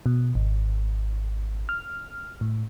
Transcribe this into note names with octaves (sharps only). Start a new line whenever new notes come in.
B2
G#1
F6
A2